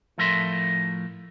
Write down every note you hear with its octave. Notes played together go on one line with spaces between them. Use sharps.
A2 F3 A4 A#4 E5 C6